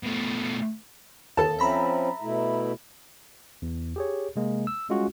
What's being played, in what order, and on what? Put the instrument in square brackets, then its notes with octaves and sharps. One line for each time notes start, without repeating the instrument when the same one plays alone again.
[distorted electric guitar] B2 A3
[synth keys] D#2 [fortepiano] A4 A5
[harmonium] F3 C4 C#4 [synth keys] E5 A#5 B5
[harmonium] B2 A3 E4
[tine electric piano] E2
G4 G#4 C#5
C3 G#3 A#3
E6
G3 G#3 C#4 F4 F#4